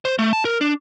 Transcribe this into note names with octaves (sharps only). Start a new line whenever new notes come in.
C5
A3
A5
A#4
D4